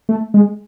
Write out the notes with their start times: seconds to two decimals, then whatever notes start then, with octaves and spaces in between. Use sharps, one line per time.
0.09 A3
0.34 G#3